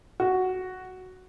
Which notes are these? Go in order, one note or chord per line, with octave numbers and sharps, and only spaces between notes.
F#4